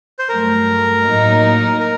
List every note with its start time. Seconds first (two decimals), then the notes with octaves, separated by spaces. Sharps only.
0.19 C5
0.29 G2 F#3 A3 A#4
1.05 A2 F#3 A#3 D#4
1.80 A#4